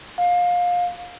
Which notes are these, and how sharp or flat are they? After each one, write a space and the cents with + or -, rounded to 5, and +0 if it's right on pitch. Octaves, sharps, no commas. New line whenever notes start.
F5 +25